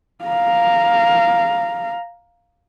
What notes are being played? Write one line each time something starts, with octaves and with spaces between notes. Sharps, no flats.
F5 A#5